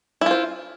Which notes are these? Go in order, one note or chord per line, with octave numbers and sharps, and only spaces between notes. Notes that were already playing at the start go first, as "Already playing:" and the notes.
E4 F4 C5